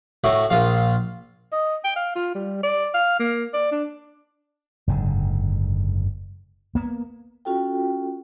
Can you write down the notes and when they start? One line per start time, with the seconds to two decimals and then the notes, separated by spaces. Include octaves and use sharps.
0.24 A2 F#4 E5 D6
0.50 A#1 F4 F5
1.53 D#5
1.84 G5
1.96 F5
2.16 F4
2.35 G3
2.64 D5
2.94 F5
3.20 A#3
3.54 D5
3.72 D4
4.88 F#1 G#2 D3
6.75 A#3 B3
7.45 C#4 F4 F#4 A4 G5